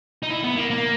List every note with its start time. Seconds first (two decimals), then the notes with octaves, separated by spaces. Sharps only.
0.23 D#4
0.30 E4
0.43 B3
0.56 A#3
0.70 A#3